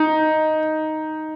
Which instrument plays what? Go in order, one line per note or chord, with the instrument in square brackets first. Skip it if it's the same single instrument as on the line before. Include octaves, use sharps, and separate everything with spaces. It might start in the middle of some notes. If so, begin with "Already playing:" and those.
Already playing: [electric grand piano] D#4